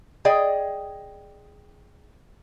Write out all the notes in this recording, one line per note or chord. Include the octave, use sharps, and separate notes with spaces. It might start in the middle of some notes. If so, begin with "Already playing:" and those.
G#4 D5 D#5 G5